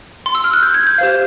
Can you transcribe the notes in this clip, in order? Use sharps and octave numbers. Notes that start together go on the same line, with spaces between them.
C6
E6
F6
F#6
G6
G#6
G6
G4 C5 F5